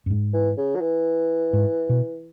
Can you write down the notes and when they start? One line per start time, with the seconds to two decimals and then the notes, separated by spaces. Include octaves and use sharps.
0.06 F#2
0.10 G#2
0.33 E3
0.57 C#3
0.76 F#3
0.81 E3
1.53 G#2
1.89 B2